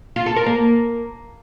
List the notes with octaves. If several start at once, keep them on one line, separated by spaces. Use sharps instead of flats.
F4
A4
A#4
A#3